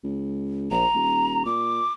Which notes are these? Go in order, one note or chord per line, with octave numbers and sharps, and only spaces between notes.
C#2
A#1 A#5
D#1
A#2 D6